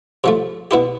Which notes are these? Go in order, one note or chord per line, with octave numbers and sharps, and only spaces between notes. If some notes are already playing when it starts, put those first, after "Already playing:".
C3 F3 A3
B2 B3 E4 G4